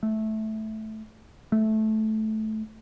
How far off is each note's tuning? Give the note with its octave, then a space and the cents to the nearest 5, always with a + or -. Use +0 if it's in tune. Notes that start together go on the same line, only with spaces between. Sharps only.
A3 -10
A3 -15